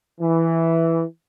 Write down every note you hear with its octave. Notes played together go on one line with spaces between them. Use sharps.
E3